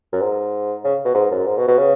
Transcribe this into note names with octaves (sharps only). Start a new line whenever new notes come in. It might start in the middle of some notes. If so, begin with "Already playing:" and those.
F#2
G#2
C#3
B2
G#2
F#2
G#2
B2
B2
C#3